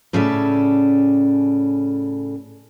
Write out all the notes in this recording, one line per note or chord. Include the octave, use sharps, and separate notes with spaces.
A2 C#3 C#4 A4 D5 E5